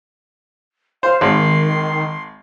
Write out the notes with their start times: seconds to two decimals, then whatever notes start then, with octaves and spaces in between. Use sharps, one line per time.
1.03 C5 F5
1.21 G#1 D#3 C6